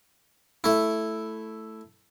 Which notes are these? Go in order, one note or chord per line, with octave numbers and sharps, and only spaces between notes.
A3 E4